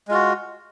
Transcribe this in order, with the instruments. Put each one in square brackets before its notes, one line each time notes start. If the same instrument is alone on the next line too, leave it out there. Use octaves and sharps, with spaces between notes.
[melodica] G#3
F4
F#4